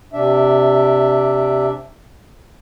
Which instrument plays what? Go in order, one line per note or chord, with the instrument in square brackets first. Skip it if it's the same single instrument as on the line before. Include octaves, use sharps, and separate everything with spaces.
[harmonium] C3 D4 E5